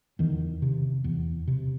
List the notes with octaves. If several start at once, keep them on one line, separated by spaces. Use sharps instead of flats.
E2 D#3
C3
E2
C3